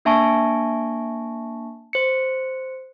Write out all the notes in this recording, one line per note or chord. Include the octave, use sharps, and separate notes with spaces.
A#3 D4 E5 G#5 A5 C#6
C5 C#7